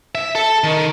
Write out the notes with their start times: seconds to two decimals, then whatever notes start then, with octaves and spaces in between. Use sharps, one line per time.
0.15 E5
0.35 A4
0.64 D#3